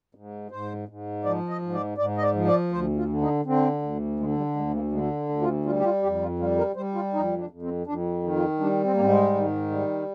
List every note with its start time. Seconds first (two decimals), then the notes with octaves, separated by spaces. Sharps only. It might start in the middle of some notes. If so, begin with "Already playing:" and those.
0.15 G#2
0.51 G#2 C5
0.89 G#2
1.25 F3 D5
1.50 D#5
1.62 G#2
1.74 D5
1.98 G#2 D5
2.18 D#5
2.23 D5
2.35 F3
2.48 D5
2.72 D2 C5
2.97 F4
3.09 D3
3.21 D#4
3.45 D3 C4
3.82 D2
4.20 D3 G#3
4.37 G3
4.56 D2 G#3
4.75 A#3
4.92 D3 G#3
5.29 D2
5.42 F4
5.66 G3 F4
5.79 G4
5.85 F4
6.03 F2 G4
6.22 F4
6.39 G3 F4
6.58 A#4
6.76 G3 C5
6.95 F4
7.14 F2 D#4
7.38 D4
7.50 F2
7.62 C4
7.87 F2 D4
8.23 D#3
8.36 F4
8.60 G3 D4
8.84 C4
8.93 A#3
8.97 G#2 C4
9.09 G#3
9.34 D#3
9.71 G3